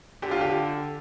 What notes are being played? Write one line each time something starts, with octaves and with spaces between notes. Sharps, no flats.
D3 G4
F4
G4